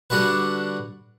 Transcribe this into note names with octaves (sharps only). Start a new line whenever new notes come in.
D3 G3 D4 F#4 B4